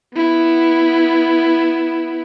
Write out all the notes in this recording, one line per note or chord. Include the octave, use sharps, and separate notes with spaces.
B3 E4